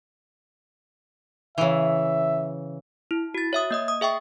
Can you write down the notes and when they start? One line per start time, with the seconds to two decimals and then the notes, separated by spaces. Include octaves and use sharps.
1.58 C#3 E3 E5
3.11 E4
3.34 F#4 A6
3.53 C#5 E5 D#6
3.71 A#3 D#5 D#6
3.88 D#6
4.01 G#4 E5 G5 C#6